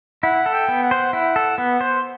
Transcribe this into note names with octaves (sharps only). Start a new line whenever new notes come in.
E4 F#5
A4
G5
B3
F#5
C5
E4 F#5
A4
B3 F#5
C5